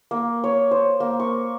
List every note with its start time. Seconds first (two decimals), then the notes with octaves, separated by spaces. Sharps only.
0.11 A#3
0.44 C#5
0.71 C5
1.00 A#3
1.20 C#6